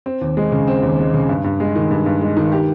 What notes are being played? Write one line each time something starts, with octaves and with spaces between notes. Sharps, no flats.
C4
D#2
G#3
C#3
C4
D#2
G#3
C#3
G2
G2
G#3
D#3
G2
G2
G#3
D#3
G4